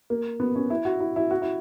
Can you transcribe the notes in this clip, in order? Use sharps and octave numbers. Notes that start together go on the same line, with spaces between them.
A#3
B3
C#4
E4
F#4
E4
E4
F#4
E4